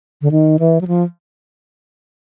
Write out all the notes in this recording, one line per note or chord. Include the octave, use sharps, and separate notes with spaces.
D3
D#3
E3
F#3
F3